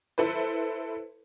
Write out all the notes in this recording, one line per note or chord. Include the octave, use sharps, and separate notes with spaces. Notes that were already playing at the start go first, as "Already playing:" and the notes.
E4 A4 B4 C5